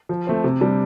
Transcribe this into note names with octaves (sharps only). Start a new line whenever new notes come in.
F3
A3 C4
C3
G3 D4